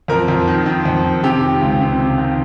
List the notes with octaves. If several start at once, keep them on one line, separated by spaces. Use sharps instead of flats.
F2 A#4
F2
D#3
D#3
F2
D#3
C3 G4
D#3
C#2
C3
C3
D#3